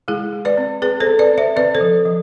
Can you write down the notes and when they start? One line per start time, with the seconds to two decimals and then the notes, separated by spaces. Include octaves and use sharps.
0.08 G#3 E4 G#4
0.33 G#3
0.45 B4 D5
0.57 C4
0.82 C4 G#4 B4
1.00 A4 C5
1.07 C4
1.19 B4 D5
1.32 C4
1.38 C5 E5
1.56 C4 B4 D5
1.75 A4 C5
1.81 F3
2.06 F3